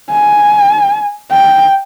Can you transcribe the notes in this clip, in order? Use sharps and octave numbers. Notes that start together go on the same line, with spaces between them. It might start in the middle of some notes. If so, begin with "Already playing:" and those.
G#5
G5